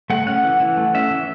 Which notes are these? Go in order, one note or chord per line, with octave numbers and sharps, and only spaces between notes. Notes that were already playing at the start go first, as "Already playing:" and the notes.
A3 F#5
C#4 F#5
E3
E3
A3
C#4 E5
E3